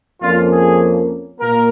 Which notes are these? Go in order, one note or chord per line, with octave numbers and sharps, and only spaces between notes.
F2 F3 A#3 C#4 F4
G#4
A#2 A#3 A#4